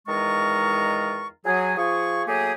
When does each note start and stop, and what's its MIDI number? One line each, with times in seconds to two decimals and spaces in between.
0.08 1.28 40
0.08 1.28 51
0.08 1.28 56
0.08 1.28 65
0.08 1.28 82
0.08 1.28 85
1.45 1.76 54
1.45 1.76 68
1.77 2.23 53
1.77 2.23 68
1.77 2.23 85
2.27 2.53 54
2.27 2.53 57
2.27 2.53 58
2.27 2.53 67
2.27 2.53 68